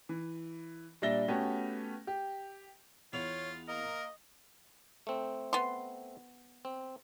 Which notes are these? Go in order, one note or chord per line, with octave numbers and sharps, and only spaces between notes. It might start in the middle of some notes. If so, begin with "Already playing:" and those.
E3
A#2 G3 D4 E5 A#6 G7
A3 B3 C#4 F#4 G4
G4
E2 B3 F4 C#5 F5
A#3 A#4 D#5
A3 C4
B3 C6
C4